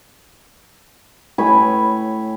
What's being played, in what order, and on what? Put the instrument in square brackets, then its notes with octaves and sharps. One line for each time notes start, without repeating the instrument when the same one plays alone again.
[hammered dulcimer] A2 C#5 G#5 B5